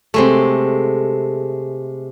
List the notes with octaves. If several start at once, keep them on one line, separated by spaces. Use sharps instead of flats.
C3 G#3 A3